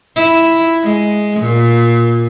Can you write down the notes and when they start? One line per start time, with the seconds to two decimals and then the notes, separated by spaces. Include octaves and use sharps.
0.16 E4
0.83 G#3
1.40 A#2